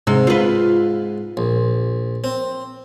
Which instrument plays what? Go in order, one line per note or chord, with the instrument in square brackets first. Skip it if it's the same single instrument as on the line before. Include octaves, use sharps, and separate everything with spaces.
[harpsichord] G#2 [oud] C3
[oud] F4 B4
[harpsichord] A#1
C4